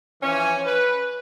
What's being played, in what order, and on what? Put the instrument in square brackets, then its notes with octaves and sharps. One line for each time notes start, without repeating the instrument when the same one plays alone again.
[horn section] E3 F3 C#4
B4